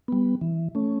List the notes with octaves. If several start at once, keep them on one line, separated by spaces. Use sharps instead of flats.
G3 B3
E3
A3 C#4